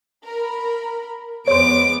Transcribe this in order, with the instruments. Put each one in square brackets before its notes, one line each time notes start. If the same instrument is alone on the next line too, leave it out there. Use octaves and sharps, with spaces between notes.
[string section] A#4 B5
[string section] F2 G#3 B3 [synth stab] C5 C#5 [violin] D6 D7